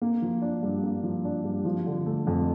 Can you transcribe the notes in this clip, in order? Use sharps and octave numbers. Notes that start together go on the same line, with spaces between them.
A#3
F3
D4
G2
A#3
F3
D4
G2
F3
D3
A3
F2